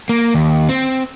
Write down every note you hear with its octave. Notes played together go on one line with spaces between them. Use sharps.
A#3
D#2
C4